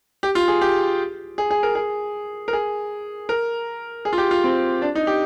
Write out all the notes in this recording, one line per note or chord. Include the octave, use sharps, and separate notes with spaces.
G4
F4
G#4
G4
G#4
G#4
A#4
G#4
A#4
G#4
A#4
G#4
F4
G4
F4
C4
D4
D#4
G4